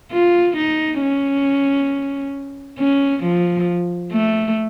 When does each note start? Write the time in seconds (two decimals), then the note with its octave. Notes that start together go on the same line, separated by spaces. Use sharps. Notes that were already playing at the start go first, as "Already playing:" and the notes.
0.12 F4
0.57 D#4
1.01 C#4
2.79 C#4
3.24 F3
4.13 A3